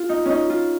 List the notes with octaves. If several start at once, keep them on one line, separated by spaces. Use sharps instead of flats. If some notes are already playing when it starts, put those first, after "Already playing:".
Already playing: F4
D#4
C#4 D#4
F4